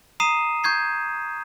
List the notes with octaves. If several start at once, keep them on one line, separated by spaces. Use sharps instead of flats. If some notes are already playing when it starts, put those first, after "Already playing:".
A#5 D#6 C7 D#7 E7
C#6 G6 G#6 C7